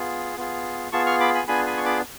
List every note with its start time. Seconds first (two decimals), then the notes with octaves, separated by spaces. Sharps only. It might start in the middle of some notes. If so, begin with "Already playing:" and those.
Already playing: B3 F4 G#4
0.37 B3 F4 G#4
0.92 B3 F4 G#4 A5 C#6
1.06 C#6 F6
1.20 B5 D6
1.34 G#5 B5
1.48 B3 D4 F4 G#4 G#5 B5
1.66 G#5 B5
1.77 C#6
1.85 B5 D6